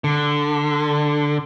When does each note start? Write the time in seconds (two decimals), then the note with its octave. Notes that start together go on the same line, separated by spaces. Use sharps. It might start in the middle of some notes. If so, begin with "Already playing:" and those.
0.04 D3